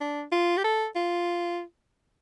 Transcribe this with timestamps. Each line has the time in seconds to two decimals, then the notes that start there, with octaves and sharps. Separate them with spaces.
0.01 D4
0.32 F4
0.57 G4
0.64 A4
0.96 F4